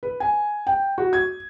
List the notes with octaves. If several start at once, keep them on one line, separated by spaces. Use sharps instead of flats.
B4
G#5
G5
F#4
G#6